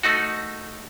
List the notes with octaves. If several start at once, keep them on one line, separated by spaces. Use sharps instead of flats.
A3 D#4 F#4